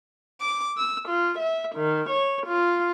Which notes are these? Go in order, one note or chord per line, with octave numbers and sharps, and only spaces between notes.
D6
E6
F4
E5
D#3
C#5
F4